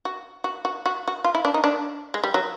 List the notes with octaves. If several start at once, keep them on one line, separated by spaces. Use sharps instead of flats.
F#4
F#4
F#4
F#4
F#4
F4
E4
D4
D#4
D4
G#3
G3
F#3